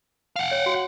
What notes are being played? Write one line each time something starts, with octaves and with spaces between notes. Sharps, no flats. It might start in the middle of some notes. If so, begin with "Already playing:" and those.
F5 F#5
C#5
F#4